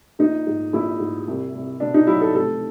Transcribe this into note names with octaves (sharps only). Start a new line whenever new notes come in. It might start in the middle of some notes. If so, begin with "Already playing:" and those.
A#1 D#4
G#2
A#1 E4
G#2
C2
C2
B2 D4
D#4
F#3 E4
A4
F1 A4